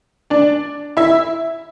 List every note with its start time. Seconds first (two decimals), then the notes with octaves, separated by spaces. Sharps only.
0.30 D4 D5
0.97 E4 E5